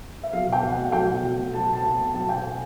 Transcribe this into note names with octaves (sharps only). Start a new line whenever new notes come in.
E5
F#3 F5
B2
G5
B2
F#5
A3
F#3 G5
B2
B2
A3
F#3 A5
B2
A5
B2
A5
A3
F#3 A5
B2 G5
G#5
B2